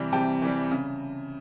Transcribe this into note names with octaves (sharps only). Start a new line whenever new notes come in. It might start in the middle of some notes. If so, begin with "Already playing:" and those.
Already playing: C3 E3 G3
C3 G5 A5
E3 G3
C#3